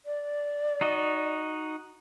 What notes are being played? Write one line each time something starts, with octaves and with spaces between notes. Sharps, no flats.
D5
D#4 F#4 D#5